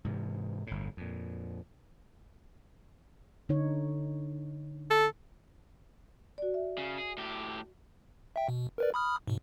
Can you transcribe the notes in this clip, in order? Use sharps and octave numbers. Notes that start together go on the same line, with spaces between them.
G#2 C3 E3
G1 A2
F2 A#2
D3 D#4 C#5
A4
F#4 D5
E5
C#3
G#4
A2 G4
E5 G5
B2
A#4 B4 D5
B5 D#6 F6
G#2 B2